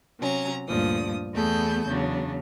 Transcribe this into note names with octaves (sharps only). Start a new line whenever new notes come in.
C3 F#3 C#4 A#5
D2 G2 A#2 F3 D#6
E2 A3 B3 G#4 A4 G6
E2 C#3 F#3 D4